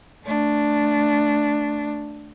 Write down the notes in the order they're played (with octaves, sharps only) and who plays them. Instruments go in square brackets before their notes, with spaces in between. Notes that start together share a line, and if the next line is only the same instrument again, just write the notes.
[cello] A3 D4